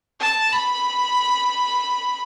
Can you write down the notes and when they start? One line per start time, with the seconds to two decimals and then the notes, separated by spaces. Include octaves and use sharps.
0.20 A5
0.53 B5